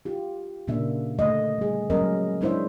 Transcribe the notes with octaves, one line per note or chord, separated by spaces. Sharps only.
F4 G4
A#2 C#3 A#3 D4 E5
D3 A3 D#5
G3 G#4
F#3 G#3 A#3 C#4 A#4 D#5
G#3 D4 E4 C5 C#5 E5